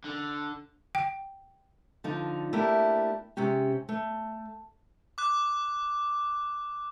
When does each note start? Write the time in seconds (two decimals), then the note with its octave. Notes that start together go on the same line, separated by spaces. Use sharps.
0.04 D3
0.95 G5
2.04 D3 F3 D#4 F4
2.53 A3 A#3 D4 E4 G4
3.37 C3 G#3 C#4 G4
3.89 A3
5.18 D6 F#6